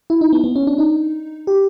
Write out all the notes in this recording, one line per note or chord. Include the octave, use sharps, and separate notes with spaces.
E4
D#4
B3
B3
C#4
D4
D#4
G4